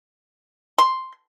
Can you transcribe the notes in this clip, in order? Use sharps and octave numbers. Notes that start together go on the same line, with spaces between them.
C6